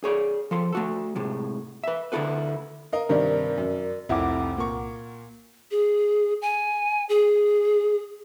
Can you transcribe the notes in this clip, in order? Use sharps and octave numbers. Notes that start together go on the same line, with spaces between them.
G#4 C#5 D5
F3 A4 C6
A3 F#4 A4
A2 C3 G#3
B4 E5
D2 D3 E4 F#4 A4 B4
A#4 D#5 F5
G2 C3 D#3 A#4 D5
F#2
F1 C2 F2 E4 F#5 D6
A#2 A#4 C#6
G#4
G#5
G#4